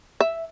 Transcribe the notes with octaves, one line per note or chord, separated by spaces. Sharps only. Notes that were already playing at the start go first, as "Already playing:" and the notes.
E5